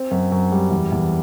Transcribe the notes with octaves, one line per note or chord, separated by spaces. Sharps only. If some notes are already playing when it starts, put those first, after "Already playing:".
Already playing: C4
F#2
F#2
G3
E2
E2